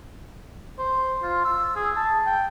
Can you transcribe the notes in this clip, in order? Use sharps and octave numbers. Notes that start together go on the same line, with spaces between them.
C5
F4
E6
G#4
A5
G5